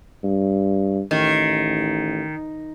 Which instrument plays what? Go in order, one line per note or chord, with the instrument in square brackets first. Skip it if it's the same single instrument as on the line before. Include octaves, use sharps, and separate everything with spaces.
[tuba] G2
[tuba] A1 [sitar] D#3